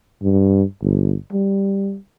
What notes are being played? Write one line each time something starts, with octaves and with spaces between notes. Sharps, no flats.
G2
G1
G3